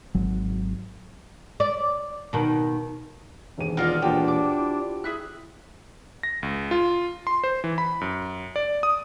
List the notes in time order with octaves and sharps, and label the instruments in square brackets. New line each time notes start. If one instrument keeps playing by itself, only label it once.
[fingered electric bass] G#1 F#3
[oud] D5
B2 D#3
[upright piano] E1 D#2 D#7
[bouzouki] B3 F4 D5 [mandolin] A#4 D#5 F5
[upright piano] E1 A#2 B4 [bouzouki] F3 F#4 G4 [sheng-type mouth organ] D4
[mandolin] D6
[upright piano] E4
[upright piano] E4 [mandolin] G#4 E5 F#6
[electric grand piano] A#6
C#2
F4
C6
C5
E3
B5
F#2
D5
D#6